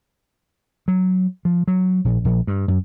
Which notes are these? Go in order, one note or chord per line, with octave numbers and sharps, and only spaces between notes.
F#3
F3
F#3
A#1
A#1
G2
F#2